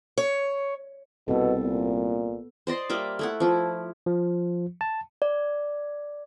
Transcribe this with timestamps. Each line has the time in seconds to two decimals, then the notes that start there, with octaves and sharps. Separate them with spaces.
0.18 C#5
1.28 C2 B2 B3 A4
1.64 A#2
2.67 C5 D5 D#5 C6
2.89 G3 A#3 E5 D6
3.19 A3 E4 F#5
3.40 F3 E4
4.06 F3
4.81 A5
5.22 D5